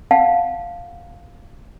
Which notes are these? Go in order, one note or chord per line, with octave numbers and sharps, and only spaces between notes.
F5 F#5 A5